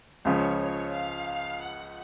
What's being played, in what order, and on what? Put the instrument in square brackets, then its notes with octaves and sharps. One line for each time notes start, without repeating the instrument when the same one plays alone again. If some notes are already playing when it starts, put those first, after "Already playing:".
[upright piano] C#2 C#3 F3 [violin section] C#5
[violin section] C#5
F5
F#5